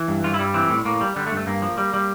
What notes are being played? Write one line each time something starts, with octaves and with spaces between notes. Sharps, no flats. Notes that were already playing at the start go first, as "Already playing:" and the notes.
Already playing: E3
G2
G2 F4
E4
G3
E3 C4
A2
A2 A#3
G3
D3 G3
A3
G2
A3
G2 A#3
F3
G3
G3